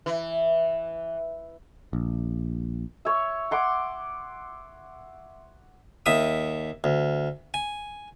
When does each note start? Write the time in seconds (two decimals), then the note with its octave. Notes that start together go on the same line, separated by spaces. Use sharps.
0.06 E3
1.93 A#1
3.05 C#5 E5
3.51 F#5 C6 D6
6.06 D#2 E5 D#6
6.84 D2
7.54 G#5